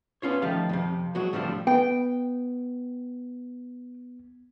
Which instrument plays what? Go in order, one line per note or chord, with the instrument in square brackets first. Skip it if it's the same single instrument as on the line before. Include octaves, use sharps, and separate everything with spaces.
[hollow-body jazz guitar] B3 C#4 F4 C#5
D#3 F3 A3 G4 F5
F2 A2 C3
F#3 G#3 F#4
A2 D3 F3 G3 C4
[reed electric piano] B3 [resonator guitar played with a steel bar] G5